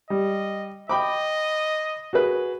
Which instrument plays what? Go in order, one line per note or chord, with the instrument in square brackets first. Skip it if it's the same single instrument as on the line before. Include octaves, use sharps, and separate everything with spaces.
[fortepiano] G3 [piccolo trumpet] D#5
[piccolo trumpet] D#5 [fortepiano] G5 B5 D6
[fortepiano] F#4 G#4 B4